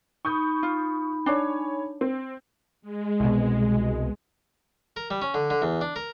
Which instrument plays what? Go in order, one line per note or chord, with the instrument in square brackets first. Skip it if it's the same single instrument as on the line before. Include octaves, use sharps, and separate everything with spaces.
[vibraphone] D#4 B5 [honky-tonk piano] C#6 D#6 G6
[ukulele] F4
[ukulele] D4 [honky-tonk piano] C#5 G#5
[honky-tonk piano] C4
[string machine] G#3
[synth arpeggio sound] C2 B2
[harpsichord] A#4
G3
C#4
D3
D3
E2
D4
A#4